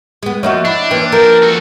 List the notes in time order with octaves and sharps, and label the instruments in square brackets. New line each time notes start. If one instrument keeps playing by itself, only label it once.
[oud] G#3 B3
[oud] F3 A#3 F#4 [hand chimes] C#5 D#5 E5
[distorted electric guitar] D4 [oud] E4
[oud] E3 [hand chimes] A#3 B4 G5
[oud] F3 [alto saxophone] A#4
[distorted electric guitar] F#4 A4